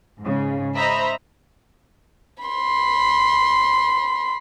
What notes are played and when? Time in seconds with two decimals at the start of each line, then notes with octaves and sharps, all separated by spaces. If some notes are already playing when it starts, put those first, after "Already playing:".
0.20 G#2 C#3
0.75 C5 D#5 E5 A#5 B5
2.43 B5 C6